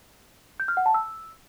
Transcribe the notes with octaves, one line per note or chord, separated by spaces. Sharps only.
G6
F6
F#5
A5
E6